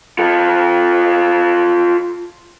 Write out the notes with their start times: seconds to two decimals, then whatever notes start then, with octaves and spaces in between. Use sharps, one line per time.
0.19 F4 A4